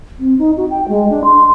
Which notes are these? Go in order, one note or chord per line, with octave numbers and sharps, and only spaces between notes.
C4
D#4
F#4
G5
G#3
D4
C6